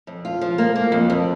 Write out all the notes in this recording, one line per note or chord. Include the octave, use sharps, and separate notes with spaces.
F2
F4
F3
A#3
A#3
F2
F2